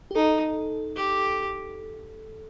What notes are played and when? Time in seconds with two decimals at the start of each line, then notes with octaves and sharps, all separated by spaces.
0.11 G4
0.15 D#4 A4
0.96 G4